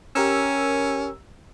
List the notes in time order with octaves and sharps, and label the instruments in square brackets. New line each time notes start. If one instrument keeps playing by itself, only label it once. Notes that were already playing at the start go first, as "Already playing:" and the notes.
[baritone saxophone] C#4 [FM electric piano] G4 A#4 E6